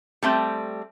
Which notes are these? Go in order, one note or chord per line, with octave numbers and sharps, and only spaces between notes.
G3 A3 C4